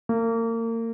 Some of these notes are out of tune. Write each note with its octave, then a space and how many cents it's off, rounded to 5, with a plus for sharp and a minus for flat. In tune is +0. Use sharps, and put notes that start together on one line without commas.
A#3 -35